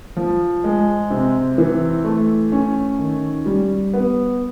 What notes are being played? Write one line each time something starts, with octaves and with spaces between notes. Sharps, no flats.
F3
G#3
C3
E3
A3
C#4
D#3
G3
B3